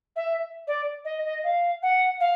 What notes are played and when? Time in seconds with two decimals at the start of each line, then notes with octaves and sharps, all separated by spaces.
0.16 E5
0.67 D5
1.05 D#5
1.25 D#5
1.44 F5
1.83 F#5
2.20 F5